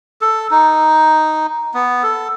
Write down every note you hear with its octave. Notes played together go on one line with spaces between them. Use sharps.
A4
D#4
B3
A4